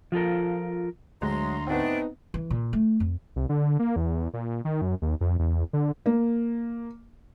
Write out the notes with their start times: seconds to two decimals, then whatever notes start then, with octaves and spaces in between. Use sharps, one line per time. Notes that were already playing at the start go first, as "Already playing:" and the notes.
0.12 F3 F4 A4 A#4
1.22 D2 F#3 G#3 A#5 C6
1.67 G#2 A3 B3 C4 D4 D#4
2.34 E3
2.50 A#2
2.73 A3
3.00 F2
3.36 C2
3.49 D3
3.79 A#3
3.96 E2
4.34 A#2
4.65 D#3
4.82 F#2
5.02 D#2
5.21 F2
5.39 E2
5.73 D3
6.06 A#3